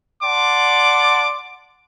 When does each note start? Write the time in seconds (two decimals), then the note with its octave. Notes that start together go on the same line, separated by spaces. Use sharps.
0.23 D5 F#5 A5 C6 D6